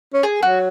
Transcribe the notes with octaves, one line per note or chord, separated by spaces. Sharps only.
C#4
G#4
F#3 F#4